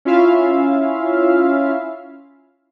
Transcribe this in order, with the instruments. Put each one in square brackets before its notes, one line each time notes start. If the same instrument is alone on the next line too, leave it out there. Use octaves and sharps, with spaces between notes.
[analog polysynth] C#4 E4 F4 E5 F5